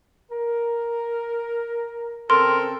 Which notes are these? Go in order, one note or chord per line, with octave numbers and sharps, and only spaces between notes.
A#4
C#3 C4 A4 A#4 C6